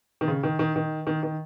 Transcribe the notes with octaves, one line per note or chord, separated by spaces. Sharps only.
D#3
C#3
D#3
D#3
D#3
D#3
D#3